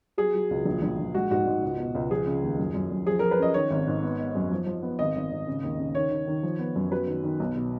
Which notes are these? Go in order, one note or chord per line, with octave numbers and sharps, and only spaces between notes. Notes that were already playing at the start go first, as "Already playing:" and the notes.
F#3 G#4
F#3
C#2
A#1
A#1
A#1
G#3 F#4
G#2 F#4
G#2
C#2
B2
C#2
F3 G#4
C#3
D#2
F#2
F#2
F#2
F3 G#4
F3 A#4
B4
C#4 D#5
D#3 C#5
G#1
G#2
B3
B3
F#2
F3
F3
B3
G#1 D#5
G#1
G#1
C#3
D#2
C#3
D#3 C#5
D#3
D#3
F3
B3
F#2
F#3 B4
D#3
D#3
B1
B2